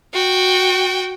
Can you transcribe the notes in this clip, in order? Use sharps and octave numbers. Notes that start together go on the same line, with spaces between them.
F#4 G5